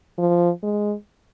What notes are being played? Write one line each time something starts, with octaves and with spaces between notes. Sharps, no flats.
F3
G#3